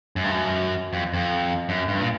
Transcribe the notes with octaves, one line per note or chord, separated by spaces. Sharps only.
F#2
G2
F#2
F2
F2
F#2
G2
A#2